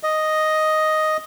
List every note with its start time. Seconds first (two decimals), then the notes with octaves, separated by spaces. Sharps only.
0.03 D#5